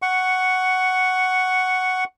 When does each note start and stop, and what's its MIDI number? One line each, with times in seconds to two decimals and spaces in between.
0.02 2.04 78
0.02 2.04 85